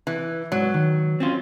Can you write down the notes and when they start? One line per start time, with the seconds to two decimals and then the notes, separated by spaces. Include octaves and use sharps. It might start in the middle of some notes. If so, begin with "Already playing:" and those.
0.07 E3
0.52 G#2 F#3
0.74 D#3
1.20 C4 C#4 F4